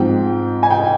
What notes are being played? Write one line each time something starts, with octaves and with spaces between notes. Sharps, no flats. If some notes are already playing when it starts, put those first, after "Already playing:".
Already playing: G#2 F3 C4 G5
G#5
G5